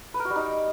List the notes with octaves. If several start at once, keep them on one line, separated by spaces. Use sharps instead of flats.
B4
A#4
F#4
G3
D#4